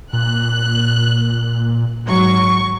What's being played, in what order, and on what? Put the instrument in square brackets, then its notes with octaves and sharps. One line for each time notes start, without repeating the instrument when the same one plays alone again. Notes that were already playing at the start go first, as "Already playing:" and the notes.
[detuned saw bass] A#2 [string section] F#6
[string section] G#1 F#3 C#6